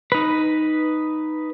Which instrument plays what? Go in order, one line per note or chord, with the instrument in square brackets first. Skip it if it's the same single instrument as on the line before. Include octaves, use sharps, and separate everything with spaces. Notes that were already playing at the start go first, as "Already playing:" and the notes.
[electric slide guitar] D#4 B4